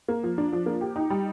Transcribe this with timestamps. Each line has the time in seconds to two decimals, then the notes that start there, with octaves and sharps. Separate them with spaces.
0.08 A#3
0.23 F3
0.38 D4
0.53 F3
0.66 A#3
0.81 G4
0.96 D#4
1.10 G3